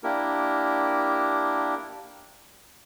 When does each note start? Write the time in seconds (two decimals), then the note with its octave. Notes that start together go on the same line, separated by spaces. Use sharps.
0.03 A#3 D4 E4 G4 A#4